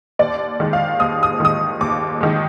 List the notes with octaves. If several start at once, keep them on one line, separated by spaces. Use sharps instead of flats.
D#2 D5
D#3 G#3
F5
D#2 D#6
D#6
D#3 G#3 D#6
D#2 D6
D#3 G#3